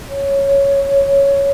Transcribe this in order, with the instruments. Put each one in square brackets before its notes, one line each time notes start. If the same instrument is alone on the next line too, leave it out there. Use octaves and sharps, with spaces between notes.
[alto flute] C#5